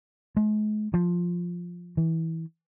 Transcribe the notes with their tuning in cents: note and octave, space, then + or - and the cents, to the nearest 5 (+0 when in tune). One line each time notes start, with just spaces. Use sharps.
G#3 +40
F3 +5
E3 -20